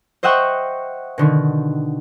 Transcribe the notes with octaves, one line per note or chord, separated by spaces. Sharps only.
C5 D#5 E5 F#5 G5 C#6
B2 D3 D#3